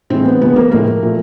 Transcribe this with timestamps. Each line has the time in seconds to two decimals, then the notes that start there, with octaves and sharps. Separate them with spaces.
0.10 A2 E3 G#3 C4
0.25 B3
0.41 D3 F3 G#3 B3
0.56 A#3
0.71 A2 F3 G#3 A#3
1.03 A#2 F3 A3